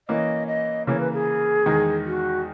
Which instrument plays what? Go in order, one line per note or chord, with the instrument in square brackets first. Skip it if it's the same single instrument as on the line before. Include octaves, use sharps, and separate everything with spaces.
[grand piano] E3 A#3 C#4 [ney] D#5
[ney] D#5
[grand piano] C#3 E3 A#3 [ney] C#5
[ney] B4
G#4
[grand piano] E2 D#3 G#3 D#4
[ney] F#4